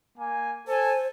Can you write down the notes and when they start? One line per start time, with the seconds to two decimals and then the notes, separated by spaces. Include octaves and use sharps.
0.18 A#3 G#5
0.68 A4 C5 G#5